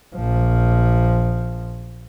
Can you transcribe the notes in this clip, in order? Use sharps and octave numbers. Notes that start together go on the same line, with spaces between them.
A#1 F3